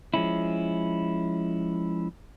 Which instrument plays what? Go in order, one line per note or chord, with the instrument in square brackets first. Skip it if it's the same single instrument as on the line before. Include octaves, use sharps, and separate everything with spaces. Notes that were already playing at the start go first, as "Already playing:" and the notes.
[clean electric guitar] F3 G#3 C#4 E4